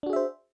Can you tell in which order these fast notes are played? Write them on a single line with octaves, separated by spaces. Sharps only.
D4 F#4 G#4 E5 C5